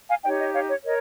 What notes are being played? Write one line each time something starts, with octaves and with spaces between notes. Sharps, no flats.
F5 G#5
D#4 G4 C#5 D#5 G5
D#5
C#5 F5
C#5
A#4 C#5 D#5